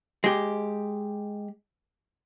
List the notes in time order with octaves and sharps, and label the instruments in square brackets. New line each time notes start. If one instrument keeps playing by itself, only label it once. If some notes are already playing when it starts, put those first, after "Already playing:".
[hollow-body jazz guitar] G#3 G4